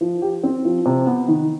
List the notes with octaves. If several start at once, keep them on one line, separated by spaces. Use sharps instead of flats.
F3
G4
C4
F3
C3
B3
D#3